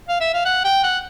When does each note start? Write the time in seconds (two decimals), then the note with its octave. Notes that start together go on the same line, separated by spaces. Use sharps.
0.09 F5
0.21 E5
0.34 F5
0.45 F#5
0.65 G5
0.84 F#5